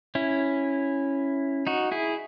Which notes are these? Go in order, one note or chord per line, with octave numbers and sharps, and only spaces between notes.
C#4 E4
D#4 F#4
E4 G#4